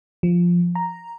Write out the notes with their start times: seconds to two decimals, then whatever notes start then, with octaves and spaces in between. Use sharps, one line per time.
0.23 F3
0.75 A#5